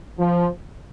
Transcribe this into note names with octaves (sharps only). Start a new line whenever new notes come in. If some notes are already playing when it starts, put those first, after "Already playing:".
F3